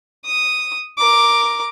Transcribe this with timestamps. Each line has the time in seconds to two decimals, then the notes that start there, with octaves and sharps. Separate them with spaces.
0.25 D#6
0.98 A#4 D6